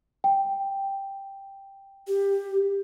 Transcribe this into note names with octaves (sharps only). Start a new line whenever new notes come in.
G5
G4